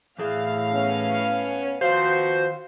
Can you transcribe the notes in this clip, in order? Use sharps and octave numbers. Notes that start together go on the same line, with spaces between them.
A2 E3 G#4 F5
B3 C#4
D#3 F3 B3 F#4 C5 F5